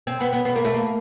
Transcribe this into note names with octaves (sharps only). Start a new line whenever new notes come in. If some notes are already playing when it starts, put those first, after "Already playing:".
C4
B3
B3
B3
A#3
A3
A#3